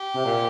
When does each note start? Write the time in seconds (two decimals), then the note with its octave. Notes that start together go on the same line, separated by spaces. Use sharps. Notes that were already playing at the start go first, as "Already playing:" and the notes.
Already playing: G4
0.16 C3
0.25 A#2